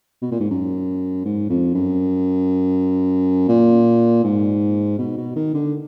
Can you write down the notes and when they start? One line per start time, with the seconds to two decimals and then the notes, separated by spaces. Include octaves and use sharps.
0.22 B2
0.32 A#2
0.40 G#2
0.50 F#2
1.25 G#2
1.49 F2
1.74 F#2
3.48 A#2
4.24 G#2
4.98 B2
5.17 B2
5.36 D#3
5.54 D3